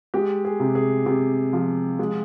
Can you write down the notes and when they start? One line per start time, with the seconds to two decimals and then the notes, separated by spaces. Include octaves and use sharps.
0.14 G#3 G4
0.45 G#4
0.60 C3
0.75 G#4
1.06 C3 G4
1.53 F3
1.99 G#3